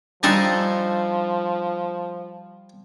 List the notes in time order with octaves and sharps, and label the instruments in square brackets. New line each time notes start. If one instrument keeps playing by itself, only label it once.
[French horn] F3 [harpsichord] G3 G#5 C6 [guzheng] D4 D#4 A4